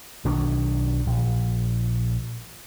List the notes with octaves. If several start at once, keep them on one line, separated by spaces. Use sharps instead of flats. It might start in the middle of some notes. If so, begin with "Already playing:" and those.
B1 D#3 F#3 D4
A#1